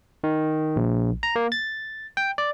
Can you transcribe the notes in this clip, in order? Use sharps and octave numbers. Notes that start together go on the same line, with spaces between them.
D#3
A#1
A#5
A#3
A6
G5
D5